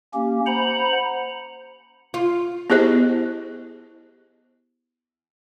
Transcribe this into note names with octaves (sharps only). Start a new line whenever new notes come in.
A#3 C#4 G4
C5 F#5 A#5 B5
F4
B3 E4 G4 G#4 C5 D#5